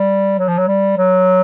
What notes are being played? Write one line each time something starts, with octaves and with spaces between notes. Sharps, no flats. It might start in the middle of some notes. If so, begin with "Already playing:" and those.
Already playing: G3
F#3
F3
F#3
G3
F#3